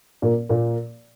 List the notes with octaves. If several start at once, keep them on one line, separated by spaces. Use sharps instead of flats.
A#2 A#3
A#2 A#3